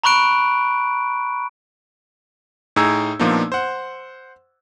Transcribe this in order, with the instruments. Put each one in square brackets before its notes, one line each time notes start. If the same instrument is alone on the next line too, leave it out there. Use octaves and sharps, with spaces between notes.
[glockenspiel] A#5 B5 C#6 F#6 D7
[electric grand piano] A2 D#4 G#4 A#5 E6 G#6
A#2 F3 A#3 B3 D4 D#4
C5 F#5